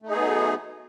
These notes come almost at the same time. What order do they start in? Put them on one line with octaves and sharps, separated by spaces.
A3 D#4 G#4 B3 F#3